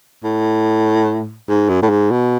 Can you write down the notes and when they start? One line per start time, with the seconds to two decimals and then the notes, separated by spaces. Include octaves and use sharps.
0.24 A2
1.49 G#2
1.69 F#2
1.83 A2
1.90 G#2
2.11 B2